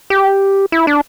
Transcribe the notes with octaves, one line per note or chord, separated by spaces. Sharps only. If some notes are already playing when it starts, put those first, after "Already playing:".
G4
E4
D4